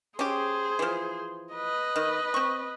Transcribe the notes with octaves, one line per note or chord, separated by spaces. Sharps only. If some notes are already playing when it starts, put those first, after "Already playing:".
C#4 G4 G#4 C5
E3 F3
B4 D#5
D#3
C4 C#6